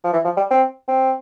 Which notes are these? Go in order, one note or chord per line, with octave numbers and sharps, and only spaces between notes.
F3
E3
F3
G3
C4
C4